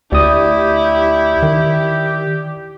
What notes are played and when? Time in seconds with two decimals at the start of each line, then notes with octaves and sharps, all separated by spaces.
0.12 D2 E4 G4 D5 D#6
1.43 D#3